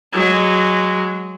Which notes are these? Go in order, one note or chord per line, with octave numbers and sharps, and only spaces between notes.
F#3 G#3